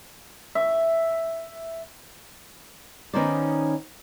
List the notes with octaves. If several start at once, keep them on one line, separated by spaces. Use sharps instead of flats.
E5
D#3 B3 C#4 D#4 C5 D5